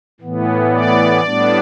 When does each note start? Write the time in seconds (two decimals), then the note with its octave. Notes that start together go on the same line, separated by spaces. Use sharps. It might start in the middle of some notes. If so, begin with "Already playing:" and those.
0.20 A2 E3 B3
0.72 D5
1.23 A2 G3 B3 D4